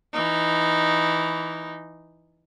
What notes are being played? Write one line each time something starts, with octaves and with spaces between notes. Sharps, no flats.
E3 D#4